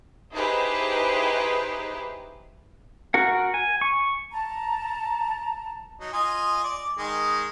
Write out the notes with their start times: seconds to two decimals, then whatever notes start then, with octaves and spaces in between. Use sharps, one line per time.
0.32 D#4 E4 G4 G#4 B4 C5
3.14 F#4 A#4 F#5
3.54 G#5
3.81 C#6
4.31 A5 A#5
6.00 F#3 D#4
6.13 F4 D#5 G#5
6.64 D5
6.98 D#3 G#3